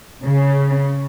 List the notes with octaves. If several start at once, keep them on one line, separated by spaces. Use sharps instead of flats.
C#3